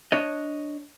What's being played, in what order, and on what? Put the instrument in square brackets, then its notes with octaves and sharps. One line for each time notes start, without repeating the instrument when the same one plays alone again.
[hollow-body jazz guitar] D4 C#5 D#5